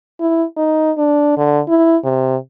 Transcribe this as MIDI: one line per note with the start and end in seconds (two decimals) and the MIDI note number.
0.20 0.44 64
0.57 0.91 63
0.98 1.37 62
1.38 1.60 50
1.69 1.97 64
2.05 2.36 48